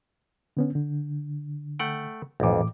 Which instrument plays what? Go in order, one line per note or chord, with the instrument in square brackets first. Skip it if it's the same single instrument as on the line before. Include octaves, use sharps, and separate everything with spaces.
[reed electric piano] D3 B3 C#4
D3
[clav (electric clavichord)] A3 F#5 G5
[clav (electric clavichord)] B1 F2 [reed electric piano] A2 E3 D6